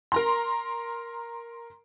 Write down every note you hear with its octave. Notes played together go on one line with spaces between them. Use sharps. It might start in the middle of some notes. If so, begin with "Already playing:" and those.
A#4 A#5 C6